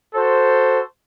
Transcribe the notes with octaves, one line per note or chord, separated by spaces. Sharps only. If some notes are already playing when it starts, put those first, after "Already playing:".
F#4 A4 C5